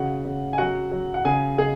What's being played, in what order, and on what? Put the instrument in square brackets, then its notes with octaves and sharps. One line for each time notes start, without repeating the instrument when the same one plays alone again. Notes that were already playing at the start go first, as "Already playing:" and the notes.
Already playing: [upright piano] C#3 F#4 F#5
C#3
G#5
F#3 F#4 F#5
F#3
F#5
C#3 G#4 G#5
C#3 G#4 G#5